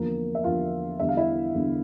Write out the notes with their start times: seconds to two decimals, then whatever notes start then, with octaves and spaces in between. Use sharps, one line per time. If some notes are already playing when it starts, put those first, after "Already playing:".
Already playing: E2 D3 F3 A#3 A#4
0.35 E5
0.44 E2 D3 F3 F4 F5
0.99 E2 D3 G3 E5
1.09 F5
1.17 E4 E5
1.54 E2 D3 G3